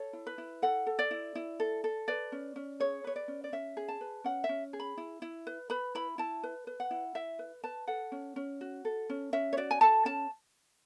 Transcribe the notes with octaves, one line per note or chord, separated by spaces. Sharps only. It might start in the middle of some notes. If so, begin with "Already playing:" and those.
Already playing: A4 C#5
E4
B4
E4
A4 F#5
A4
D5
E4
E4
A4
A4
B4 D5
C#4
C#4
G#4 C#5
B4 C#5
D5
C#4
D5
C#4 E5
G#4
A5
B4
C#4 F#5
E5
C#4
G#4
B5
E4
E4
B4
B4 B5
E4 B5
E4 A5
B4
B4
F#5
E4
E4 E5
B4
B4 A5
A4 F#5
C#4
C#4
F#4
A4
C#4
C#4 E5
C#5
F#4 D5
G#5
A4 A5
C#4 A5